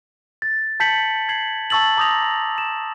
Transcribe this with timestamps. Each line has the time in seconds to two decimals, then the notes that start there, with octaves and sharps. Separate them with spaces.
0.42 A6
0.80 A5 G6 B6 C#7 F#7
1.29 G#6 C7 F#7
1.70 A5 C#6 E6 A6 F#7
1.97 A#5 D6 D#6 G6 A#6 F7
2.58 E7